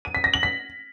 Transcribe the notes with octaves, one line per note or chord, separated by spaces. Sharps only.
D#7
B6
A#6
F#7
B6